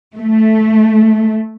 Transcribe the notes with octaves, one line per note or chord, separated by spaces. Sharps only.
A3